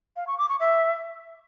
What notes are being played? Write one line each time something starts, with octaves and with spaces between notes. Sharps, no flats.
F5
C#6
D6
C#6
E5